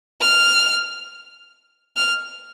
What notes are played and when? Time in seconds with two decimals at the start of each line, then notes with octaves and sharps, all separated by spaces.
0.21 F6
1.97 F6